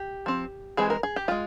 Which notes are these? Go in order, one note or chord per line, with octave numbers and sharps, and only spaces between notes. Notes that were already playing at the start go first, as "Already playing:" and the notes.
Already playing: G4
F3 C4
E3 G#3 C4 G#4
A#4
G#4
G4
G#3 C4 F4